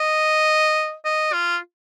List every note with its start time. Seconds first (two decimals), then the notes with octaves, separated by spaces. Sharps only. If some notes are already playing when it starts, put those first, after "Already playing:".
Already playing: D#5
1.05 D#5
1.33 F4